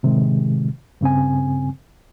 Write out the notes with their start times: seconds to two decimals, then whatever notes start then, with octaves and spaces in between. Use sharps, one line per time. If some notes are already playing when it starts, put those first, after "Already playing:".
0.03 A2 C3 D#3 G#3
1.01 G2 C#3 C4 G#5